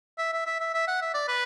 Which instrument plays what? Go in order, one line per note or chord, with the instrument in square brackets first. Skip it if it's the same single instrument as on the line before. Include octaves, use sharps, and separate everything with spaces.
[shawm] E5
E5
E5
E5
E5
F#5
E5
D5
B4